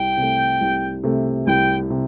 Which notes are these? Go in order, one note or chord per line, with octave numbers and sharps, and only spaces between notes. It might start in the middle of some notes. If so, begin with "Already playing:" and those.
Already playing: C2 G5
C3 A3
C2
C3 A3
C2 G5
C3